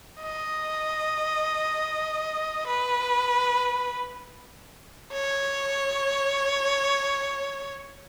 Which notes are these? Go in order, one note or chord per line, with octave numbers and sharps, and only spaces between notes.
D#5
B4
C#5